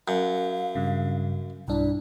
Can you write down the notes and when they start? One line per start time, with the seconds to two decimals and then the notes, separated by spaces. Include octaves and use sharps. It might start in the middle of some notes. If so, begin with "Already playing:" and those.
0.08 F#2 F5
0.75 G2 C#3
1.68 B1 G2 D4 E4